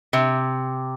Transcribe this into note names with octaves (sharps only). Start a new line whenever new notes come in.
C3